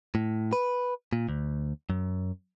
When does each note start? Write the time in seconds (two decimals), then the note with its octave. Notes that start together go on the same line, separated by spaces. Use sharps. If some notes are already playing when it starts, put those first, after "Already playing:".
0.15 A2
0.53 B4
1.13 A#2
1.29 D2
1.90 F#2